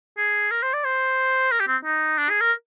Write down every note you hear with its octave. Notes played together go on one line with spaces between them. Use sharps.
G#4
A#4
C5
D5
C5
A#4
G4
C4
D#4
D4
G#4
A#4